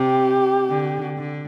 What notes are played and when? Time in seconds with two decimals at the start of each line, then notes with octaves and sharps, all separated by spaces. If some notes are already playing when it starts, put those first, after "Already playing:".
Already playing: C3 G4
0.70 D3
1.17 D3